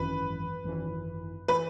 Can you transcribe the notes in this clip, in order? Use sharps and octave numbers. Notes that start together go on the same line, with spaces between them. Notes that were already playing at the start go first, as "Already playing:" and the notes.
Already playing: G#1 F#2 E3 B4
G#1 F#2 E3
E3 B4